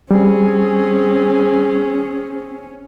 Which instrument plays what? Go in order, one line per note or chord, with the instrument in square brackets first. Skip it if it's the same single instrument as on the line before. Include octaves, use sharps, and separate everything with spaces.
[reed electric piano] G3 [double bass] C4 [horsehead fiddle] C#4 [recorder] G#4